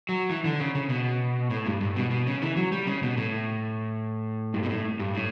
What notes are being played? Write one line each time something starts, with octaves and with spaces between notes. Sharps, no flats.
F#3
E3
D3
C#3
C#3
B2
A2
G2
G2
B2
B2
C#3
E3
F#3
G3
C#3
B2
A2
G2
B2
A2
G2
A2